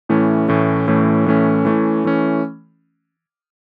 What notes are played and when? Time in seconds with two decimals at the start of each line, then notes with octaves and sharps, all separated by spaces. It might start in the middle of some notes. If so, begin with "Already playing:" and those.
0.09 A2 E3 A3 C#4
0.48 A2 E3 A3 C#4
0.87 A2 E3 A3 C#4
1.26 A2 E3 A3 C#4
1.65 E3 A3 C#4
2.05 E3 A3 C#4